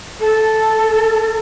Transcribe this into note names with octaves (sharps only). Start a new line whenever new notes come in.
A4